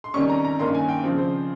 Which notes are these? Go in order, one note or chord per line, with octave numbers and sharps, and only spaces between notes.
C6
C3 D#3 G3 C#4 C#6
A#5
A#5
G2 D#3 A#3 C#4 C6
G#5
G5
C#3 F3 C4
C5